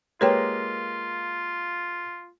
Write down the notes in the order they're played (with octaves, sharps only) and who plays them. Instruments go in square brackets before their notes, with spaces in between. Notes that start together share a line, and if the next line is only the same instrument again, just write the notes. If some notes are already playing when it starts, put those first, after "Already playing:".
[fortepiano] G#3 A#3 G4 [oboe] F4 [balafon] B4 C#5 G5